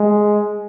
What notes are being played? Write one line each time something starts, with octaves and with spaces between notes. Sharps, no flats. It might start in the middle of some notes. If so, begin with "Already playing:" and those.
Already playing: G#3